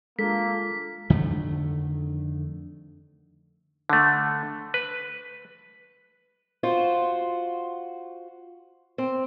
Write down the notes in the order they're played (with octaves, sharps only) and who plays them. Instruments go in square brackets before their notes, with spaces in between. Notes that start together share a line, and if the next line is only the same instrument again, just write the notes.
[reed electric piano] G#3 D4 F4 [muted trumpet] A#3 [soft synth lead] A4 [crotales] B6
[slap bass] F2 D3 D#3 A3
[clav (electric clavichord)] D3 A3
B4
[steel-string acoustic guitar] F4 F#4 C5
C4